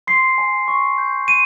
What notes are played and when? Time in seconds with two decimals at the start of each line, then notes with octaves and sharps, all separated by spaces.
0.07 C6 C7
0.38 G#5
0.68 C#6
0.98 G6
1.28 C6 D#7